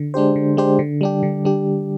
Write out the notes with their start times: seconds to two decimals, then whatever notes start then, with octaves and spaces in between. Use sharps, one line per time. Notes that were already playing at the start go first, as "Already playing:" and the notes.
Already playing: D3
0.14 G#3 D4 G4 C5
0.36 D3
0.57 G#3 D4 G4 C5
0.79 D3
1.01 G3 D4 G4
1.23 D3
1.45 G3 D4 G4